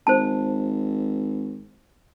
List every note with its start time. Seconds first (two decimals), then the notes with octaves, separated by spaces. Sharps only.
0.07 G#1 C5 A5